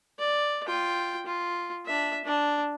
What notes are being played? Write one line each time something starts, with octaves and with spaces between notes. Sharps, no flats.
D5
F4 G5
F4
D4 E5
D4